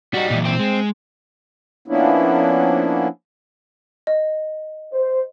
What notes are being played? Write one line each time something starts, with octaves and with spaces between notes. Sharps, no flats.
G3 D#4 F#4
A#2 E3
C4
G#3
F3 A#3 B3 C#4 D4 E4
D#5
C5